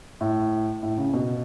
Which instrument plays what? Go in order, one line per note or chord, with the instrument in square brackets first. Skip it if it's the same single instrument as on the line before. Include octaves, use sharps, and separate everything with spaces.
[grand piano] A2
A2
C#3
B2